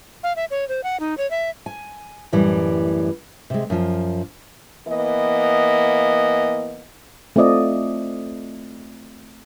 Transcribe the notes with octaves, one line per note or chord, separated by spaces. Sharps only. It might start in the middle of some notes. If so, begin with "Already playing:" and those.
F5
E5
C#5
C5
F#5
D#4
C#5
E5
G#5
F#2 A2 E3 G3
C3 G#3
F#2 F3
E3 A#3 B3 D#5
A3 C4 F4 D5 D#5